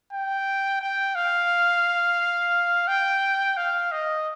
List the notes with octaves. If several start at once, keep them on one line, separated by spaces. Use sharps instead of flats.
G5
G5
F5
G5
F5
D#5